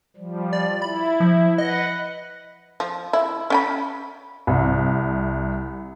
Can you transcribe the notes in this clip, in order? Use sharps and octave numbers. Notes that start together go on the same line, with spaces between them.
F3 G3
D5
E4 B5
F3
B4 D#5 F#5
F3
E4
C#4 G5 B5
C2